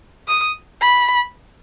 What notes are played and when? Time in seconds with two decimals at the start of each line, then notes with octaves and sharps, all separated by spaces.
0.28 D#6
0.81 B5